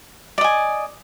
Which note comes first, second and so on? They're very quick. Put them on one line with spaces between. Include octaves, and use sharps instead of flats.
D5 D#5 G#5